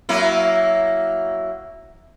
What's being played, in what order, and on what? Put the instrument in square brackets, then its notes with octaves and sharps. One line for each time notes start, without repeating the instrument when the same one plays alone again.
[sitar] F#3 A#3 E4